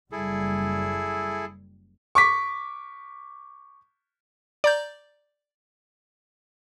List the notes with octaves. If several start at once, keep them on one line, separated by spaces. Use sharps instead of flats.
F#1 G3 E4 G#4 A4
C#6 D6 B6
D5 A#5 G6